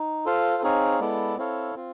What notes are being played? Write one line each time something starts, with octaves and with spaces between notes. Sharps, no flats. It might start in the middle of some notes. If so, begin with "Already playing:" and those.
Already playing: D#4
F4 A4 C5 F5
C4 D#4 G#4 C#5 F5
G#3 B3 E4 A4 D5
C4 E4 A4 C#5 F5
C4 F4